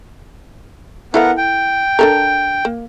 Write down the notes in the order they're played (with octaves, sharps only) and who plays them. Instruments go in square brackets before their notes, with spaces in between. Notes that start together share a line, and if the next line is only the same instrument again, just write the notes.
[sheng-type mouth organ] B3 A#4 F#5 [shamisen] E4 A4 F5
[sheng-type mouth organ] G5
[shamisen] D4 A4 A#4
A#3